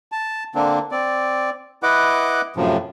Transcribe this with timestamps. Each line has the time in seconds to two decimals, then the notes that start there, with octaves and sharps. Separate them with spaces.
0.12 A5
0.55 D3 A#3 C4 D4
0.91 C4 D5
1.83 E4 B4 D#5 F#5 D6
2.56 F#2 A2 C3 F3